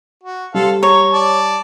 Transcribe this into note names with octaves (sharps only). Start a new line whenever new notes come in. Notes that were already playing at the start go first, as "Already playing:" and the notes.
F#4
G3 A4 C5 F5
C#5 A#5
D5 A5